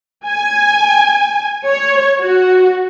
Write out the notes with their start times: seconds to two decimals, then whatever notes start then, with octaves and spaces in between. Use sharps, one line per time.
0.26 G#5
1.67 C#5
2.21 F#4